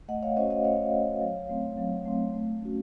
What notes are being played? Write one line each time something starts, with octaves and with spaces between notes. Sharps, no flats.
A3 D#5 F#5
C#5 F5
C#4 F#4 C5 D#5
D#5 F#5
A3 C#5 F5
C#4 F#4
F#3
A3 C4
F#3
A3 C4
A3
C#4 F#4